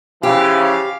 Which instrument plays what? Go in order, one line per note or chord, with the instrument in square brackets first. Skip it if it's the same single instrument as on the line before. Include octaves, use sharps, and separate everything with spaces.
[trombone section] C#3 E3 F3 [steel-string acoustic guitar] G4 [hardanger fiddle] F5